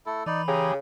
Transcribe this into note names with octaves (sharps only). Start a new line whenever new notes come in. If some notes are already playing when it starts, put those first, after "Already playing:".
A3 E4 A4
E3 D#4 D5 B5
C#3 G4 G#4 A#5